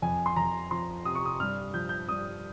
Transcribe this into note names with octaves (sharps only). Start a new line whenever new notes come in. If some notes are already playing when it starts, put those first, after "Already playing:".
F2 G#5
C6
F2 A#5
F3 C6
C3 D#6
C#6
D#6
G2 F6
F3 G6
G6
G2 D#6